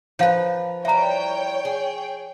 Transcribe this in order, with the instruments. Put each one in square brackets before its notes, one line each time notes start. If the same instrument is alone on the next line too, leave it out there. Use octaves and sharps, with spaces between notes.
[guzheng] F3 B4 [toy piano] C#5 F5 [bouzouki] A#5
[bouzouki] E3 G3 [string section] C#5 G5 [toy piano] E5 A#5
[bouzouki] G#4